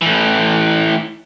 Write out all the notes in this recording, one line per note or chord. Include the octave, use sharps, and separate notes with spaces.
A2 E3